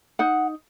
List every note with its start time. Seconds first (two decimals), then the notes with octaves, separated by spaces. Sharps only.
0.19 D#4 F#5